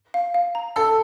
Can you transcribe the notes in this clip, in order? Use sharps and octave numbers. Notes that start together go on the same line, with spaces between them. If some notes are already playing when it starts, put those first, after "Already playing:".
F5
F5
A#5
A4 E6